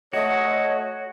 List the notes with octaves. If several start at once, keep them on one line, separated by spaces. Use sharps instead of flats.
A3 F#4 C#5 D#5